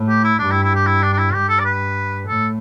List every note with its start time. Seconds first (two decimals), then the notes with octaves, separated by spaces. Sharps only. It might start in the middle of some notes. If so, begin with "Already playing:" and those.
Already playing: A2
0.08 G4
0.24 E4
0.39 G2 D4
0.51 E4
0.63 E4
0.75 G4
0.87 E4
1.02 D4
1.13 D4
1.18 E4
1.34 G2 G4
1.49 A4
1.60 D5
1.65 B4
2.27 A2 A4